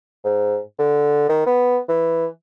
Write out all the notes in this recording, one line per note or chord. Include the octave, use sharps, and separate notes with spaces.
G#2
D3
D#3
B3
E3